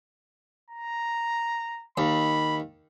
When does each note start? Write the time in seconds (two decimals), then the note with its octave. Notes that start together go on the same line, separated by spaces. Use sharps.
0.70 A#5
1.98 D#2 B5